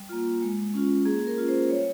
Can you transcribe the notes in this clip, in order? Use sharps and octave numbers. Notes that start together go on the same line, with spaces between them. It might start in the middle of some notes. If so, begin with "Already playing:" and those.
Already playing: G3
A#3 F4
G#3
C#4 F4
A#3 G#4
A#4
C#4 F4
C5
G3 C#5